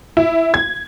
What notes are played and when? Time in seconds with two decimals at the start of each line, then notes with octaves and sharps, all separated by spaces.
0.17 E4
0.54 G#6